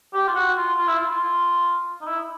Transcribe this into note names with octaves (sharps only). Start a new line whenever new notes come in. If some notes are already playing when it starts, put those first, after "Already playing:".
G4
F4
F#4
F4
F4
E4
F4
F4
D#4
E4